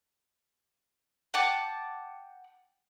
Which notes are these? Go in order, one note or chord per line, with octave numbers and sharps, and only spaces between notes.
F#5 G5 A5 D6